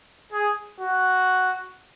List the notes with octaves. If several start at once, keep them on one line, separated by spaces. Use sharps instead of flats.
G#4
F#4